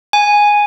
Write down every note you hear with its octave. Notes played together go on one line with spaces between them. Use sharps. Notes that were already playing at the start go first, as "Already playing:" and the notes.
G#5